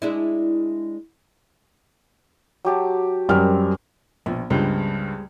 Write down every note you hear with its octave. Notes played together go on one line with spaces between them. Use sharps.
G#3 D4 E4
F#3 G4 A5
F#2 G3 C4 A#4 F6
A#1 B2
C#2 G2 G3 G#3 C5